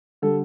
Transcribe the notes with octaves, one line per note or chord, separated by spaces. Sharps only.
D3 G3 A4